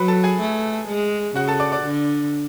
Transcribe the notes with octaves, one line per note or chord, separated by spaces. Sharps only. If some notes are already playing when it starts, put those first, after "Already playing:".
Already playing: F#3 B4 B5
A4 A5
G#4 G#5
A3
G#3
C#3 F#4 F#5
A4 A5
D5 D6
D5 D6
D3